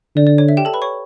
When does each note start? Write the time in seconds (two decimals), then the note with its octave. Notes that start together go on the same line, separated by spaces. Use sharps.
0.16 D3 D5
0.27 D5
0.38 C#5
0.49 E5
0.57 G4 G5
0.65 A4 A5
0.74 B4 B5
0.82 C#5 C#6